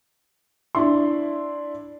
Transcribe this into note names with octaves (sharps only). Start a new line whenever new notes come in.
D4 E4 C6